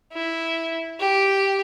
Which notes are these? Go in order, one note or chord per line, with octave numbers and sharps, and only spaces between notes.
E4
G4